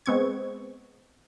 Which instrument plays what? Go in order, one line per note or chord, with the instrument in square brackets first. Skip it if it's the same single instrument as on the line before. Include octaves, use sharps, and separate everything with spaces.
[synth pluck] G#3 B3 C4 C#6 G#6